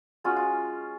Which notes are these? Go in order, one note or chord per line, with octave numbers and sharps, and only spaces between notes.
G#3 C#4 F4 F#4
F4